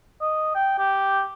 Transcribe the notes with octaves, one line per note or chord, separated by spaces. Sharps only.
D#5
G5
G4